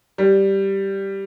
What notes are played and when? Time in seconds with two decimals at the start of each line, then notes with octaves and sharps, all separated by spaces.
0.18 G3